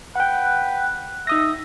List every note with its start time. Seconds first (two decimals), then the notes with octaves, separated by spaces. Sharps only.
0.16 B4 F#5 G5
1.27 D#4 E5 D#6 A#6